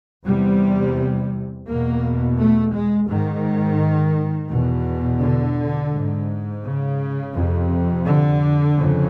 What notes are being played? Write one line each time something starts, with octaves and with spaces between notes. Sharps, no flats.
E2 C3 G3
E2 B2 A#3
A3
G#3
G#2 D#3
E2 B2
D3
G#2
C#3
F2 C3
D3
F2 C#3